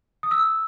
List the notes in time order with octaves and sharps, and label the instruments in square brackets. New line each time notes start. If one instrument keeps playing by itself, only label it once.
[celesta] D#6
E6